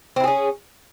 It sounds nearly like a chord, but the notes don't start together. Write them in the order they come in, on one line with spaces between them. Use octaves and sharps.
C4 E4 G#4 C#4